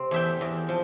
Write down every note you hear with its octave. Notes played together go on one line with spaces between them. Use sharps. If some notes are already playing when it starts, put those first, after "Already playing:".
Already playing: C3 C4
E2 E5 G5
E2
F3